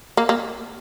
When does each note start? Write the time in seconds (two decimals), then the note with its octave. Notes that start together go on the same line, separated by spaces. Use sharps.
0.17 A#3
0.29 A#3